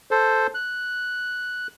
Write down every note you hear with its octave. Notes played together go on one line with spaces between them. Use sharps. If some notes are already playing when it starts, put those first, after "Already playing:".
A4 C5
F#6